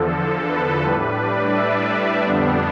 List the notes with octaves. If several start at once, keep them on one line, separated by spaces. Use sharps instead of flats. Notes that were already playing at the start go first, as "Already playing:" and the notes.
Already playing: E2 D3 F3 A4
A4
B4
A2 G3 D4 B4
D5
E5
F2 D3 G3 B3 D4